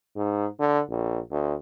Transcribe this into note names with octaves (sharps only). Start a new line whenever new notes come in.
G#2
D3
A#1
D2